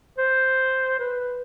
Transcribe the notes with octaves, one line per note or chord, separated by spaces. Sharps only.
C5
B4